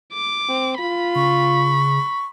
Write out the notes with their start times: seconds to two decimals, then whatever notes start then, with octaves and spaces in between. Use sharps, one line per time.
0.13 D6
0.49 C4
0.79 F4 B5
1.15 C#3 C#6